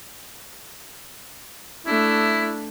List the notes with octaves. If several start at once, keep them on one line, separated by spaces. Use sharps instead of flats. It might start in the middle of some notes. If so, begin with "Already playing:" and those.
A3 D4 E4